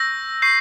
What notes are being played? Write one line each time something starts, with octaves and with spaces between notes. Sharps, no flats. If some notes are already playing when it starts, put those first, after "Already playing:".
Already playing: C#6 E6 G6 A#6
C#6 E6 G6 C7